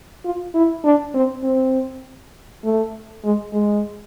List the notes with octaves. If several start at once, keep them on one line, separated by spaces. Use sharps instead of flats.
F4
E4
D4
C4
C4
A3
G#3
G#3